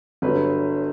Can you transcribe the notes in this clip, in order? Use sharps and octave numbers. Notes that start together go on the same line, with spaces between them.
G1 G2 F#3 B4